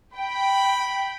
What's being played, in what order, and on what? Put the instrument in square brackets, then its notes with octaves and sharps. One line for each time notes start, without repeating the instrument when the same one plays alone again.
[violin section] G5 [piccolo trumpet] B5